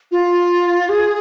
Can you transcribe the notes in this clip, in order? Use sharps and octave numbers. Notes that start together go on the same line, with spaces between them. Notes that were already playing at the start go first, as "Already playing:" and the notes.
F4
G#4